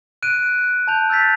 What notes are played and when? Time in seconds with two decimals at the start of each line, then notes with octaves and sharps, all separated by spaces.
0.23 F#6 D7 D#7
0.88 A5 G6 F7
1.10 E6 G6 A6 B6